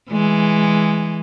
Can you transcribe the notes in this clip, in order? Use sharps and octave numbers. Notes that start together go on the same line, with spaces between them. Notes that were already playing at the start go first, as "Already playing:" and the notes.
E3 G#3